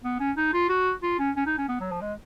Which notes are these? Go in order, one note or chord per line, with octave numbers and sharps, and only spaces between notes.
B3
C#4
D#4
F4
F#4
F4
C#4
C#4
D#4
C#4
B3
F#3
F3
G#3